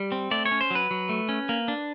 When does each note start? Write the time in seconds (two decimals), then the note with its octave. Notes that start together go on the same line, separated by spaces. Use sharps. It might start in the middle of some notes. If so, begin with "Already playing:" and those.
Already playing: G3
0.12 C4
0.31 A3 D5
0.46 C#5
0.51 C#4
0.61 C5
0.71 F#3 B4
0.91 F#3
1.09 A3
1.29 C#4
1.49 A#3
1.68 D4